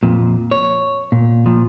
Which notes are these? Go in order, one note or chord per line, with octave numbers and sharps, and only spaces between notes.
F2 A#2
C#5
A#2
A#2 F3